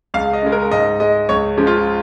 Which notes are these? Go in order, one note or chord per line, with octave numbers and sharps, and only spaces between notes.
C#2 F5
D#5
C#3 G#3
A#4
G#2 D#5
G#3 D#5
C#2 C#5
C#3 F3 G#3
F4